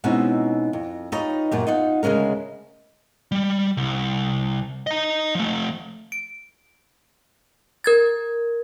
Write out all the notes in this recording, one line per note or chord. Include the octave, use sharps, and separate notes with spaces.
G#2 B2 C4 C#4 D#4 E4
F2
D#4 F4 G4 B4 C#5 D#5
F#2 A#2 G4
D#4 F4 F#5
D2 C#3 G#3 C#4 A#4
G3
C2
D#5 A#5
F3 A3
D7
A#4 G#6 A6